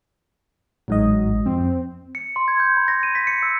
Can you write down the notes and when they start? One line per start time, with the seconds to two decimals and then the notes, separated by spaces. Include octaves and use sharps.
0.88 A1 G#2 F#3 D#5
1.46 F2 C4
2.15 C#7
2.36 C6
2.48 G#6
2.60 G6
2.77 B5
2.88 A#6
3.03 D#7
3.15 B6
3.27 C#7
3.43 E6